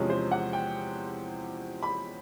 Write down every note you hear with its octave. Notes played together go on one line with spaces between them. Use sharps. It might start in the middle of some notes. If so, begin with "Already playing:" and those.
Already playing: E2 C3 F3 G#3 C#4 C#5
C5
F#5
G5
B5